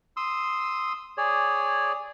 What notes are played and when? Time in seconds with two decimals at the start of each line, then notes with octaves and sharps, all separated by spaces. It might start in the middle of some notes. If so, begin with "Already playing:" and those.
0.17 C6 D#6 E6
1.18 G#4 C#5 D5